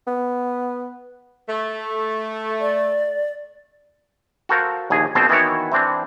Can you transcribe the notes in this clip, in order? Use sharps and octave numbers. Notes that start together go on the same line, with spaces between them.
B3
A3
D5
F#4 A4 A#4 C5 F5
A#1 D#2 G#4 G#5
A#1 B2 C4 C5 A5
D#3 E3 B3 E4 F#4 C#5
E3 C4 D4